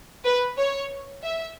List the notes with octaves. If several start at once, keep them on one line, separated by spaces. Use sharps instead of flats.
B4
C#5
E5